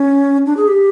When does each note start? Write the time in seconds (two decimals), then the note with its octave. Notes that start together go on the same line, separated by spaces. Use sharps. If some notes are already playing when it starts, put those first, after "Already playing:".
Already playing: C#4
0.46 D4
0.57 G#4
0.68 G4